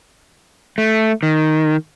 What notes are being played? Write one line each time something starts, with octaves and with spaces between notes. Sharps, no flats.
A3
D#3